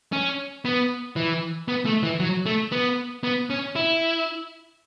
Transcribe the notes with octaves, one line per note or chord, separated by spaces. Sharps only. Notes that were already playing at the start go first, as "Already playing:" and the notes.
C#4
B3
E3
B3
A3
E3
F#3
A3
B3
B3
C#4
E4